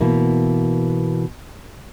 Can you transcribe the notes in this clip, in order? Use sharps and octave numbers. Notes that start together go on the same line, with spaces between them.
B2 E3 A#3